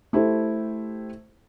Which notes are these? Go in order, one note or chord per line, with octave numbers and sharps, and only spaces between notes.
A3 E4 G4 A4 C5